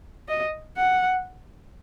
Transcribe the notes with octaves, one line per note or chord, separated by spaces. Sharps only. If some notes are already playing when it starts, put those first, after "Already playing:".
D#5
F#5